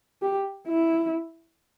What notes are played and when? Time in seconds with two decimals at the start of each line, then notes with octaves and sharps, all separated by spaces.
0.22 G4
0.68 E4